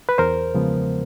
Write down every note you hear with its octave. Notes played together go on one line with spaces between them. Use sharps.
B4
E2 A#4 C5
C#3 F3 G#3 B3